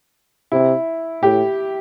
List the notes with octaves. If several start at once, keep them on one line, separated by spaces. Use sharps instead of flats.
C3 E4
A2 G4